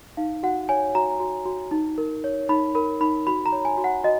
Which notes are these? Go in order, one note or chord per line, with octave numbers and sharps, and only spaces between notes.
D#4 F5
F#4 F#5
C#5 G#5
F#4 A#5
F#4
F#4
D#4
A#4
C#5
D#4 B5
A#4 B5
D#4 B5
F#4 B5
A#5
C#5
G#5
F#4
F#5
F#4 D#5